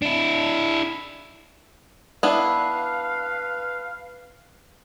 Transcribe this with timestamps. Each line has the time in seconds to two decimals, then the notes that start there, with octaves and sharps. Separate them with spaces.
0.02 D4 E4
2.23 B3 D4 E4 B4 F5